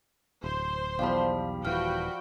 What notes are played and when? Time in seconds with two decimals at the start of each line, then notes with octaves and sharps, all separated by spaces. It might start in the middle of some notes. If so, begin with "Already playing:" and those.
0.44 D1 C5 C6
0.99 B1 E2 F3 G3 F5 B5
1.65 D#1 E3 F#4 F5 G5 B5 F6